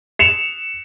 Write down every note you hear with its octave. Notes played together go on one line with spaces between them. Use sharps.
C#7 E7 F7